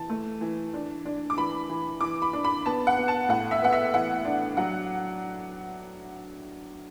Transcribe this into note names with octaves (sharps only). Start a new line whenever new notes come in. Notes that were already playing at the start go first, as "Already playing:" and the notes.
Already playing: E3 A5
A3
E3
D4
D4
D6
E3 B5
E3
E3 D6
B5
D4
B5
B3 A5
F#5
B3
A5
A2 F#5
E5
B3 F#5
E5
E3 F#5
D4
F#3 F#5